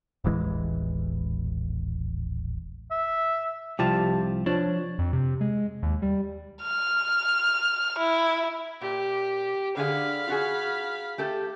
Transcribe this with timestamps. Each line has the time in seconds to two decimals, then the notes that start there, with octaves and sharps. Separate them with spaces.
0.24 D#1 A1 E3 G#3
2.91 E5
3.79 C2 F3 G4 A5
4.46 F3 D4 C#5
4.99 F2
5.13 C3
5.41 G#3
5.83 D#2
6.02 G3
6.62 F6
7.99 E4
8.81 A#2 G4
9.77 D3 G#4 F5 B5
10.27 F4 F#4 G#4
11.18 A3 G4 A4